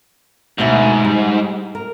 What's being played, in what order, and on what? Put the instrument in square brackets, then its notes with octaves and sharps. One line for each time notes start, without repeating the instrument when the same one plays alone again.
[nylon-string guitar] D2 B2 E5 [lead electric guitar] G#2
[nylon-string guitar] G3
A#4